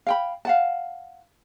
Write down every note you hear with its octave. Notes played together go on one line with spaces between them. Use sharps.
F5 G5 B5
F5 F#5 A5